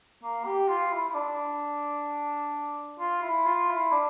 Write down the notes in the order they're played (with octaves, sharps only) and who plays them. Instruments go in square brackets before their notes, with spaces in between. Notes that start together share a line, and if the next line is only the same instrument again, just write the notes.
[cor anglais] A#3
G4
F4
E4
E4
D4
F4
E4
F4
E4
D4